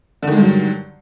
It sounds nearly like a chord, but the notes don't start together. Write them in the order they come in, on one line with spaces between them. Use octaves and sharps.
D3 D#3 G#3 G2 F#3